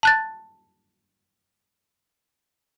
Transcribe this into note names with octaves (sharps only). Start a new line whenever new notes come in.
A5 F#6 A6